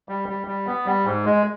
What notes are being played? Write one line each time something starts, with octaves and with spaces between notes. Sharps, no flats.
G3
G3
G3
B3
G3
G#2
G#3